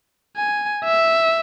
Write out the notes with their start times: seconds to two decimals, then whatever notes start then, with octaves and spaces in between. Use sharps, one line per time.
0.36 G#5
0.85 E5